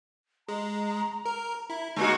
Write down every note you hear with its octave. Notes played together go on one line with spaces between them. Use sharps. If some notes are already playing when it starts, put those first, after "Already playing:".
G#3 A#5
A#4
E4
G#3 A#3 D#4 F#4